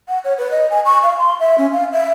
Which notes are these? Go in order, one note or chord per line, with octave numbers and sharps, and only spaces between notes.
F#5
C#5
B4
D#5
G#5
C#6
F5
C6
E5
C#4
F5
E5